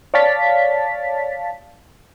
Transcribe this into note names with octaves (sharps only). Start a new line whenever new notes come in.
C#5 D5 F5 A5 A6 B6